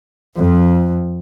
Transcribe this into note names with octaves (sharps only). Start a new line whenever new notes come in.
F2